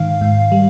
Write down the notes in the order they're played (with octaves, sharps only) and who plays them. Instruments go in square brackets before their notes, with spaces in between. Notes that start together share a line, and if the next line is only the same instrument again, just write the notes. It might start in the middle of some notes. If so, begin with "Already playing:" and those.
Already playing: [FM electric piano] G#2 D#3 F5
G#2
G3